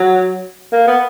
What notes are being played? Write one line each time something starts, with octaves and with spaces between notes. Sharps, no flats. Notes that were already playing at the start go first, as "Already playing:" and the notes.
Already playing: F#3
A#3
B3